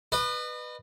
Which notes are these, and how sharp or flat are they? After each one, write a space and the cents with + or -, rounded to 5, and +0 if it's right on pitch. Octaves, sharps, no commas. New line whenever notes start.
B4 +0 D#5 -40